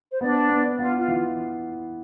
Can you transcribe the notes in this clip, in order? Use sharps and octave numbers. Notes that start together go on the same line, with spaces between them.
C5
B3 D4 D5
B3
B3 F4 F5
F4 F5
E3